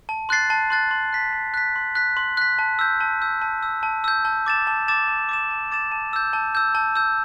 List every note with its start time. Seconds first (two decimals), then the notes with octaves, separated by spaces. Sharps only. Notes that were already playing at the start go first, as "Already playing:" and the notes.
0.09 A5
0.29 C6 F#6 A6 C7
0.50 A5
0.70 C6 F#6 A6 C7
0.91 C6
1.13 F#6 B6
1.33 C6
1.54 F#6 B6
1.76 C6
1.95 F#6 B6
2.17 C6
2.37 F#6 B6
2.59 A5
2.79 E6 G6
3.01 A5
3.22 E6 G6
3.42 A5
3.63 E6 G6
3.83 A5
4.04 E6 G6
4.25 A5
4.46 D6 A6 E7
4.67 A5
4.88 D6 A6 E7
5.08 A5
5.29 D6 A6 E7
5.51 A5
5.72 D6 A6 E7
5.92 A5
6.13 E6 G6
6.33 A5
6.55 E6 G6
6.75 A5
6.95 E6 G6